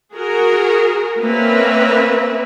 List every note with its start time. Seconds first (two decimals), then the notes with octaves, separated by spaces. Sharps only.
0.15 F#4 G#4 A#4
1.19 A#3 C4 C#4 B4 E5